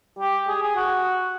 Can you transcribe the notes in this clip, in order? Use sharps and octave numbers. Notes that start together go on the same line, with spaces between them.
G4
G#4
G#4
F#4